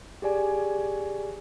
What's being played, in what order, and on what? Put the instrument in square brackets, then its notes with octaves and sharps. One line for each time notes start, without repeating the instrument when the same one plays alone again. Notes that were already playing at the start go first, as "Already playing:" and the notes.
[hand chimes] G4 G#4 D5 G#5